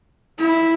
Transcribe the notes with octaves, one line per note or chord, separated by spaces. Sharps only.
E4